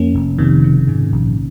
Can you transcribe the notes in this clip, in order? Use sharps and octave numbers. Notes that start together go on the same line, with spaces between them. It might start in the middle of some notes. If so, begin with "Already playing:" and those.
Already playing: F2 A#3 C#4
F1
F1 C3 D#3
C#3
G#2
A#1